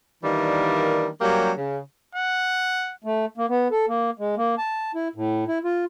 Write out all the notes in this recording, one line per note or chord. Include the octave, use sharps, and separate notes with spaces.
D#3 E3 G3 A#3 D4
F#3 G3 A#3 C#4 G4
C#3
F#5
A3
A#3
B3
A4
A#3
G#3
A#3
A5
E4
A2
E4
F4